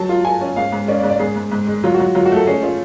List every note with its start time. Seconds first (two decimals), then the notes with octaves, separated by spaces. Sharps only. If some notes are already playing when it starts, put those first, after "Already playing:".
Already playing: F#3 A5
0.09 F4
0.24 F4 G#5
0.41 C#4
0.56 G#2 F5
0.72 G#2
0.88 C#4 D5
0.99 D5
1.03 G#2
1.10 D5
1.19 G#2 G#4
1.36 G#2
1.51 G#2
1.67 G#3
1.84 F#3 F4
1.94 F#4
2.00 F#3
2.15 F#3 F4
2.25 F#4
2.32 A3 A4
2.47 C#4 G#4
2.63 C#4 F4